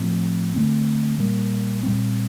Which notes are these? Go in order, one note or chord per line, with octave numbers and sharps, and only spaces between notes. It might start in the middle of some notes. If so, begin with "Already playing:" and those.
Already playing: A2 F3 C4
D3 A3 C4
A#2 G3 A#3
A#2 G3 C4